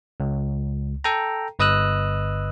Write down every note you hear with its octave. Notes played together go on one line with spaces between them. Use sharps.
C#2
A4 G5 A#5
G1 B4 D#5 D#6 E6 F#6